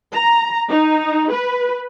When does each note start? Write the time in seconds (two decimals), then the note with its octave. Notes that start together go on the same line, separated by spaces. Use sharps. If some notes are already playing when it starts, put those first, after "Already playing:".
0.14 A#5
0.68 D#4
1.32 B4